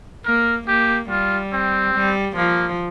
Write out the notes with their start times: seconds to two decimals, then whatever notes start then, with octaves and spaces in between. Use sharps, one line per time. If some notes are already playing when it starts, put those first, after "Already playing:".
0.25 A#3 A#4
0.68 A#3 G4
1.10 G3 F4
1.53 C4
1.94 G3
2.36 F3 A#3